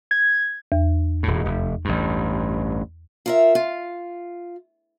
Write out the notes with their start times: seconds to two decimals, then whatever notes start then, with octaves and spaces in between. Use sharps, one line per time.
0.11 G#6
0.72 E2
1.23 D#1 A2
1.46 F1
1.85 A1 G2
3.26 F4 A#4 E5
3.55 F4